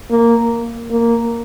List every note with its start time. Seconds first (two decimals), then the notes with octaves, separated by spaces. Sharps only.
0.11 A#3
0.91 A#3